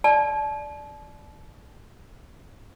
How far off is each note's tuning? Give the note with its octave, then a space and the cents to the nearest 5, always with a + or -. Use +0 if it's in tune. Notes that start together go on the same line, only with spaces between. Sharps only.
D5 +0 A5 -35